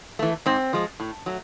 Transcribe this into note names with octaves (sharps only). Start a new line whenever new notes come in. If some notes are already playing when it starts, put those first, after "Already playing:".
E3 A3
G#2 C4
F3 G#3
A2
F#3 A3